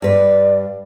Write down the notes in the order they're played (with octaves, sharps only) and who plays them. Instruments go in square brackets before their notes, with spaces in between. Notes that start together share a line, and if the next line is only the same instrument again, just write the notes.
[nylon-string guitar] G2 B4 [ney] D5